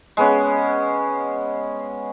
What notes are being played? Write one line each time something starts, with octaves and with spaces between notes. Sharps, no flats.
G#3 B3 C#4